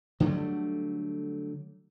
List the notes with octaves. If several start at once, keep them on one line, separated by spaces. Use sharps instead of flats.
D3 F#3 G3 A3